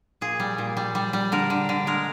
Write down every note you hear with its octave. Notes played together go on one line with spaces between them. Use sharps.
A#2 G#4
G3
A#2
G3
G3
G3
D3 A#4
D3
D3
G#3 A#4